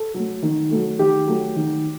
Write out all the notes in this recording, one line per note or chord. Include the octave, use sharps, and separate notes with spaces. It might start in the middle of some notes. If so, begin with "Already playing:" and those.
Already playing: A4
F#3 A3
D#3
F#3 A3
D#3 G4
F#3 A3
D#3